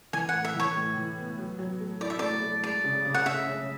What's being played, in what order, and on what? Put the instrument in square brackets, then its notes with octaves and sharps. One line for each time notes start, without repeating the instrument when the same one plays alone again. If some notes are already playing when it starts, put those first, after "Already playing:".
[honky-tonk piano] E3 [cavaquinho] G#5
[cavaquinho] F#5
[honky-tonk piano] A2
[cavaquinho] E5
[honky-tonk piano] E3 [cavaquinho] C#5
[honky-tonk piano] A2
E3
B3
F#3
F#3
A3
[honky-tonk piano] E4 [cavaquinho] D5
[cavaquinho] E5
[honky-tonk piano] A3 [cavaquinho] D5
[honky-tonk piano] A3
[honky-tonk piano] G#3 [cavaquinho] D5
[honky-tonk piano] C#3
C#3
[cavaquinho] F#5
[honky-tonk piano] C#3 [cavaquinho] E5
[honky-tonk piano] C#4